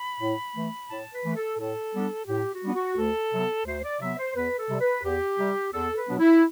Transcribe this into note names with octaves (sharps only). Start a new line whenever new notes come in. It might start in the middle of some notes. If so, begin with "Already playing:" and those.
Already playing: B5
A2
E3 A3
A2 A5
B4
E3 A3
A4
A2 A4
G3 B3 D4
A2 G4
F#4
G3 B3 D4
F#4
D2 A4
C3 F#3 B3
D2 C5
D5
C3 F#3 B3 E5
C5
E2 B4
A4
C3 G3
B4
E2 G4
C3 G3
E2 A4
B4
B2 F#3 B3 D4
E4